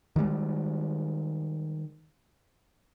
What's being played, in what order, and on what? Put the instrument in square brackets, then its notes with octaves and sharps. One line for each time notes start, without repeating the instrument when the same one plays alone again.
[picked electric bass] D#3 F3 G3 G#3